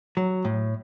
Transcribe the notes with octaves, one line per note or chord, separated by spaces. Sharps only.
F#3
A2